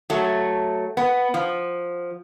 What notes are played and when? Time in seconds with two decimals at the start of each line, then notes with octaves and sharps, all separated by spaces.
0.10 F#3 A3
0.97 B3
1.34 F3